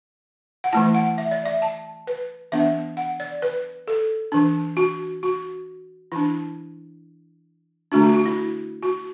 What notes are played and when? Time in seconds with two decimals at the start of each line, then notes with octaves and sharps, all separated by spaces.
0.64 F#5
0.73 E3 A3 E4 A5
0.95 F#5
1.18 E5
1.31 D5
1.45 E5
1.62 A5
2.07 B4
2.52 E3 B3 D4 E5
2.97 F#5
3.20 D5
3.42 B4
3.88 A4
4.32 E3 D4
4.77 F#4
5.23 F#4
6.12 E3 D4 E4
7.92 D3 A3 D4 F#4
8.04 F#4
8.14 F#4
8.26 E4
8.83 F#4